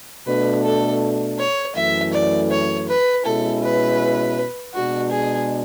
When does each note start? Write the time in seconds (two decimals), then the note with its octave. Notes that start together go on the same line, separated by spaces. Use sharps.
0.27 B2 A3 D4 B4
0.64 A4
1.39 C#5
1.76 F#2 E3 A3 E5
2.13 D5
2.51 C#5
2.89 B4
3.25 B2 G#3 C#4 E4 A4
3.62 B4
4.74 B2 G#3 D4 F#4
5.12 G#4